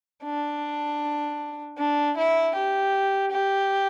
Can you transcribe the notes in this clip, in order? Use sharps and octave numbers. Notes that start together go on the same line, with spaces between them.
D4
D4
E4
G4
G4